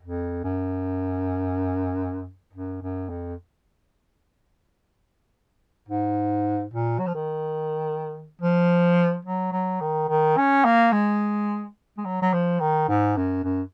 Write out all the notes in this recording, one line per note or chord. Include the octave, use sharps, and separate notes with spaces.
F2
F#2
F#2
F#2
F2
G#2
A#2
F#3
F3
D#3
F3
F#3
F#3
D#3
D#3
C#4
A#3
G#3
G#3
F#3
F#3
F3
D#3
G#2
F#2
F#2